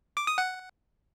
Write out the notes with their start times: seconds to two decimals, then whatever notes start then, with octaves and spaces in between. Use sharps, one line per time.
0.17 D6
0.27 D#6
0.38 F#5